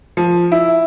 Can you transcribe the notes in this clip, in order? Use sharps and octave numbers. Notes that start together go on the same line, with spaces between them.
F3
E4